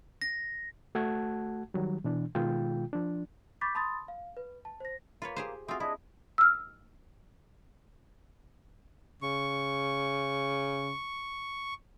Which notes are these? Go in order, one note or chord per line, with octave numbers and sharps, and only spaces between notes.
A#6
A3 F#4 F#5 A5 G#6
D#3 F#3 G3
B2 E3 D4
B2 D#3 G#3 F4 G5
F3 D4
B5 C#6 D6 G6 A6 B6
A5 B5 C6 D#6 A6
F5
B4
A5
C5 A#6
A#3 F4 B4 C#5
G4 G#4 C5
C4 F4 F#4 G#4 E5
D4 E4 G#4 D#5
E6 F6
C#3 C#6